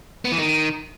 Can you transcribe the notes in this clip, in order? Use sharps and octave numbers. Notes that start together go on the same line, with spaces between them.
B3
E3
D#3